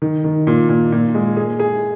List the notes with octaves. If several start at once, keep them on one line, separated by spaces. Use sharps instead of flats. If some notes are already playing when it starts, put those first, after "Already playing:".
D#3
D#3
A#2
A#2
A#2
G#3
G#4
G#4